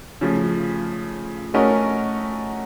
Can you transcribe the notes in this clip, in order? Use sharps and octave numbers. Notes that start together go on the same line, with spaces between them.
C#3 F3 A3
A3 C#4 F#4 A#4 D#5